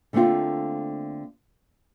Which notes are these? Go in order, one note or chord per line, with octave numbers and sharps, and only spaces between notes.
D3 A3 A#3 C4 F4